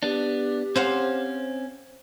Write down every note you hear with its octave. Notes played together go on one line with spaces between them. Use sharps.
B3 D4 G4
C4 C#4 C5 F5 F#5